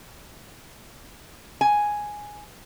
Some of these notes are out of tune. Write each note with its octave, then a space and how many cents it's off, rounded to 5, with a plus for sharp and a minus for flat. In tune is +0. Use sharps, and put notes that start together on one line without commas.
G#5 +0